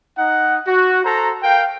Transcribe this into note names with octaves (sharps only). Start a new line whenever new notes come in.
D#4 F#5
F#4
A4 C5 A#5
A#4 F5 G5